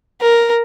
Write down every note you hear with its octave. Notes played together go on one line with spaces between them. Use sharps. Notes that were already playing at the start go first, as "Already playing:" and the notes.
A#4